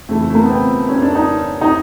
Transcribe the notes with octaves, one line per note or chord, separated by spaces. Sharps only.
F2 C#3 E3 A3
A3
A#3
B3
C4
C#4
D4
D#4
D#4